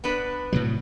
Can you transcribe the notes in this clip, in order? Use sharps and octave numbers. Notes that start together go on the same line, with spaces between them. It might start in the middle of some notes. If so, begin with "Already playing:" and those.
B3 D4 B4
A2 C3 F#3